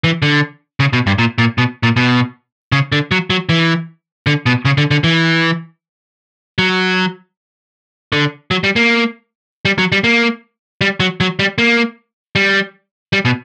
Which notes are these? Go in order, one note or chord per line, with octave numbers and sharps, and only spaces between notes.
E3
D3
C#3
B2
G2
A#2
A#2
B2
A#2
B2
C#3
D3
F#3
F#3
E3
D3
B2
C#3
D3
D3
E3
F#3
D3
F#3
G3
A#3
G3
F#3
G3
A#3
G3
F#3
F#3
G3
A#3
G3
G3
B2